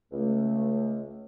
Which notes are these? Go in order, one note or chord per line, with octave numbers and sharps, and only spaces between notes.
C#2 A3